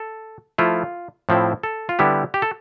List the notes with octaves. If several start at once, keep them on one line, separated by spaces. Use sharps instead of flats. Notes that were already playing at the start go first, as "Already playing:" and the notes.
Already playing: A4
F3 A3 E4 F4
A2 F3 C4 E4
A4
F4
D3 G3 B3 E4 G4
G4
A4